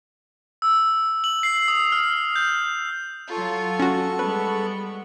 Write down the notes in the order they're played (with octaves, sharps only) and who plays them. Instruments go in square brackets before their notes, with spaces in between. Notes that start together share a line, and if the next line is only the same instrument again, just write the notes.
[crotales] E6
F#7
C7
D#6
F6
G6
[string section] F#3 F4 [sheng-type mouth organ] A4 C#6
[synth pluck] C#4 F#4
[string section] G3 G#3 B3 [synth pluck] B4